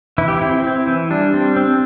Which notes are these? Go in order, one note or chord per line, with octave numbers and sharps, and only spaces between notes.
E3 E4
G4
C4 E4
C4
E3
G3 D4
C4
C4